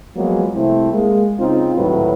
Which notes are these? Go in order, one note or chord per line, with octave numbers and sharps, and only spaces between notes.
F3 F#3 G#3 A#3 B3
C2 C3 A3 C4 E4
G#3 A#3
C#3 C4 D#4 F4
G#1 D2 A2 F#3 G3 B4